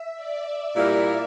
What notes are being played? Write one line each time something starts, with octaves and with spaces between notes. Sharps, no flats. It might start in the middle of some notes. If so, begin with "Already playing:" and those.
Already playing: E5
D5
A#2 G3 A#3 E4 A#4